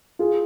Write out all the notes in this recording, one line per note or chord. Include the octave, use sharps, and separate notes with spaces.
F4 G#4